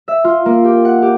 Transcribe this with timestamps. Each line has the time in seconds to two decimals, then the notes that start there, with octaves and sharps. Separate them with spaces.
0.08 E5
0.24 F4
0.45 A#3
0.64 G4
0.85 F#5
1.02 G4